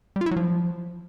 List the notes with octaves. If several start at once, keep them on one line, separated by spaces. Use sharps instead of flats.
G3
F4
E4
F#3
F3